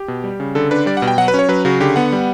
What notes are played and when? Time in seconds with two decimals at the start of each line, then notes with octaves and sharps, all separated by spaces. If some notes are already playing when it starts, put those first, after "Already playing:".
Already playing: G4
0.08 B2
0.24 G3
0.40 C#3
0.55 D3 A4
0.71 D4 B4
0.86 G3 D5
0.97 F#5
1.02 B2
1.08 G5
1.18 F#3 F#5
1.28 B4
1.34 C#4
1.39 C#5
1.49 F#3 B4
1.65 C#3 F#4
1.80 D3 G4
1.96 B3 F#5
2.12 G3